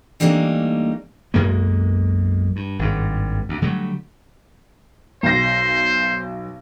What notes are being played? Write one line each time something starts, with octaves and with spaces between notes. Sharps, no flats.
E3 G3 A3 A#3 D4 D#4
B1 F#2 G#3 A#3
G2
G#1 G2
D2
D3 F#3 G3 A3
B1 C5 F5 A#6